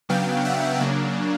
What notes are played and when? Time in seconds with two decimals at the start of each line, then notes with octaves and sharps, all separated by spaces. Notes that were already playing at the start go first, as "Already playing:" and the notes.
0.09 C#3 F#3 B3 D4 F5 G5
0.45 E5 F#5
0.81 C#3 F#3 A#3 D4